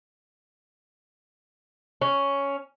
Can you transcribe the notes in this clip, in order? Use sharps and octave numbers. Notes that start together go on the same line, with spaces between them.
C#4